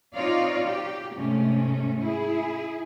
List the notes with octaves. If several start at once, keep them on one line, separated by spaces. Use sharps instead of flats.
C4 D#4 F4 C#5 D5 F5
G4
G#2 C3 A3 C#4
E4 G#4